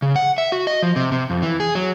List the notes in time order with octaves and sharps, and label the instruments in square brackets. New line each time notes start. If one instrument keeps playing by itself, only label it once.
[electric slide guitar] C#3
F#5
E5
F#4
D#5
F3
C3
C3
F2
E3
G#4
F#3